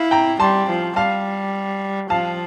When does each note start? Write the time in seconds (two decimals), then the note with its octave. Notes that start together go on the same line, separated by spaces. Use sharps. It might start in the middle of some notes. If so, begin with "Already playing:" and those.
Already playing: E4 F5
0.11 G5 A#5
0.40 G3 A5 C6
0.69 F3
0.96 G3 F5 A5
2.10 F3 F5 A5